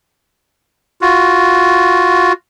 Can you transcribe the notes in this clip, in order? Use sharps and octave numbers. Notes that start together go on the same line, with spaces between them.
F4 F#4